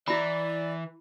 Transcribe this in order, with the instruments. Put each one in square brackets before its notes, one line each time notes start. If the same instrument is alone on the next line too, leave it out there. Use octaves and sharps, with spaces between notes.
[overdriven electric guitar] E3 [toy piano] E4 B5 [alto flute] D5